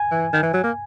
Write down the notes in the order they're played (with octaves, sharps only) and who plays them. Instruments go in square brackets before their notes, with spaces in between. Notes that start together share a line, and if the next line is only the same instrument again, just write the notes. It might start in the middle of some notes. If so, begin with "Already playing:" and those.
Already playing: [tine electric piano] G#5
[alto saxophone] E3
D#3
E3
F#3
A#3